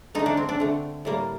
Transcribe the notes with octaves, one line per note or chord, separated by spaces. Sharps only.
D3 A3 D#4
D4
C4
D4
D3 A3
A2 G3 A#3